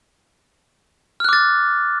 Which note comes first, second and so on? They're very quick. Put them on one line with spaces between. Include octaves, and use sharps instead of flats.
F6 F#6 D6 A6